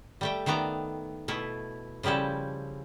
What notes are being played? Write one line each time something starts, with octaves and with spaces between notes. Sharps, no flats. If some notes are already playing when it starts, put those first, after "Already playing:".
G3 A3 G5
D#3 A3 B3 D5 A#5
B2 A3 E4
C#3 F3 G3 E4 A4